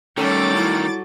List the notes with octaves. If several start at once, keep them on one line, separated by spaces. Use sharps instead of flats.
D#3 F#3 G3 A3 C#4 A4 D6 A6
E4